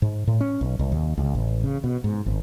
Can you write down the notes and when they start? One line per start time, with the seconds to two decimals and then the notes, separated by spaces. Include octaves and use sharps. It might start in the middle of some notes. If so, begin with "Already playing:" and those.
0.02 G#2
0.27 A2
0.41 C#4
0.61 B1
0.79 C2
0.92 D#2
1.18 C#2
1.35 A1
1.64 C#3
1.84 B2
2.04 G#2
2.26 G#1